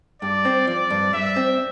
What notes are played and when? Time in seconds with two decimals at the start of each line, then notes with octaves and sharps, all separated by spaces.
0.22 G2 D5
0.45 C4
0.67 F3 D5
0.90 G2
1.13 G2 E5
1.36 C4